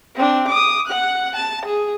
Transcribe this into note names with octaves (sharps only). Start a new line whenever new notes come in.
C4 D4
D6 D#6
F#5 F#6
A5
G#4